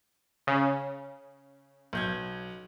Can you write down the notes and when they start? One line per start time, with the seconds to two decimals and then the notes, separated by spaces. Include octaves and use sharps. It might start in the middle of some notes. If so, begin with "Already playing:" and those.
0.47 C#3
1.93 B1 G6 G#6